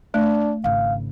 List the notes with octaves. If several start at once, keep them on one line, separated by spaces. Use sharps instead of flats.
A3 D4
G#1 C#3 F5